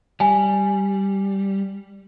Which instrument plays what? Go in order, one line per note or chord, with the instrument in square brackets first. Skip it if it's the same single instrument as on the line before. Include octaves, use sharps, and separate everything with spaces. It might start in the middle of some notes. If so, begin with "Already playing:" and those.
[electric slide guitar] G3 [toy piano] G#5